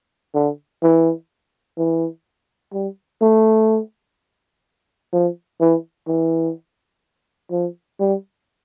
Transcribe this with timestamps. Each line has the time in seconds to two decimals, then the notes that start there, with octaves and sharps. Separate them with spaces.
0.34 D3
0.82 E3
1.77 E3
2.73 G3
3.21 A3
5.13 F3
5.60 E3
6.07 E3
7.51 F3
8.00 G3